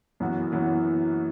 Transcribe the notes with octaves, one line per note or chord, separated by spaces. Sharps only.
F#2 E3 B3 F#4
F#2 E3 B3 F#4